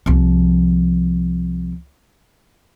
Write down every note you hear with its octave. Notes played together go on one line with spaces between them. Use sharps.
C2 F3